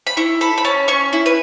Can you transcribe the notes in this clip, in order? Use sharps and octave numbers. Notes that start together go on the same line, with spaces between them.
B5
E4 C#6
A4 B5
B5
C#4 A5
C#4 C#6
E4
B4